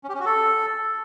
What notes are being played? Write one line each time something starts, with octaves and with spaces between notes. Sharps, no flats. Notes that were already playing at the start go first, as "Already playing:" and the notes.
C#4
G4
C#4
F#4
A4